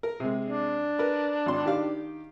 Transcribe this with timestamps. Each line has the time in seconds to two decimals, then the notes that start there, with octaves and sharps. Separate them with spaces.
0.03 A#4
0.20 C3 G#3
0.45 D4
0.99 A#4 B4
1.46 G#1 C6
1.66 D#3 G4 F5